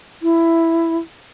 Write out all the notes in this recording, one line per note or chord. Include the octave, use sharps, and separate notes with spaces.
E4